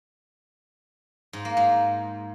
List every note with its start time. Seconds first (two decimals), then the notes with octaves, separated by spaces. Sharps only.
1.33 G#2
1.45 A#3
1.57 G#2